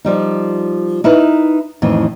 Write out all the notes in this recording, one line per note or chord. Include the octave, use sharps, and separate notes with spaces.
F3 G3 D#4
D#4 E4 A#4 B4
F2 A2 D#3 E3